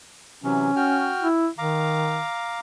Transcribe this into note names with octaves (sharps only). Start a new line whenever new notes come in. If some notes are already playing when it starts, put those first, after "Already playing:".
C3 E3 F#3 C#4
F#4 G5 F6
E4
D#3 F5 A#5 D6